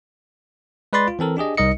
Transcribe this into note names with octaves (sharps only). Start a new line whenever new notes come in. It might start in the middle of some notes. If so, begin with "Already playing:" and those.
G#3 B4 D5 B5 C6 A6
F4
E3 C4 A4 A#4
D4 G4 G#4 D#5
C2 G3 D#4 A#4 D#5 C#7